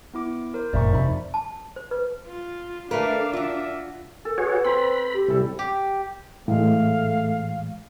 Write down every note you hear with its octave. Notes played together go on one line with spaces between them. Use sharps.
B3 E4 D6
A#4 C5
G1 F#2 A#2 D5 E5 C#6
F2 C3 D#4 E5 B5
A5
C5
B4
F4
A3 D4 A#4 B4 F5
F4 F#4 E5
A4 A#4
F#4 G#4 B4 C#5
C4 B5
G4
C3 G3 E4 A4
G4
A2 E3 G#3 A3 F5